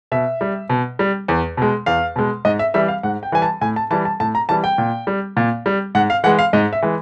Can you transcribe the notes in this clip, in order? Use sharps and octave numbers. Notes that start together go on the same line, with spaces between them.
B2 E5
G3
B2
G3
E2
B2 G#3
E2 F5
B2 G#3
G#2 D#5
E5
E3 G3 E5
F5
G#2 F#5
G5
E3 G3 G#5
A5
A2 G#5
A5
E3 G3 A5
A5
A2 A5
A#5
E3 G3 A5
G5
A#2
G3
A#2
G3
G#2 F#5
F5
E3 G#3 F#5
F5
G#2 D#5
E5
E3 G#3